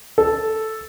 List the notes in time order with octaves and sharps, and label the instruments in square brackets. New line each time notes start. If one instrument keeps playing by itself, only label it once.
[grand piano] A4